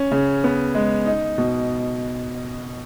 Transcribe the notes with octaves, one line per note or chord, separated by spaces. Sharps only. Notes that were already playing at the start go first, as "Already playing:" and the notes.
Already playing: C#4
C#3
B3
G#3
D#4
B2